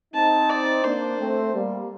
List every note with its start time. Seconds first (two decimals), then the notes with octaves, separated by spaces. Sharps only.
0.14 C4 D#4 A5
0.49 D5
0.84 A#3 D4 C5
1.19 A3 C4
1.53 G3 A#3